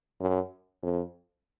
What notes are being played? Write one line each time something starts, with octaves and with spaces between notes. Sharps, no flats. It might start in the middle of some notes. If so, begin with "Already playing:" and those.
F#2
F2